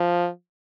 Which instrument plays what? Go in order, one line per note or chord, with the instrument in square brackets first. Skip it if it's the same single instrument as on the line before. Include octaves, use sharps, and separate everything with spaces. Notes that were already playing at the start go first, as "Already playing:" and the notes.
Already playing: [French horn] F3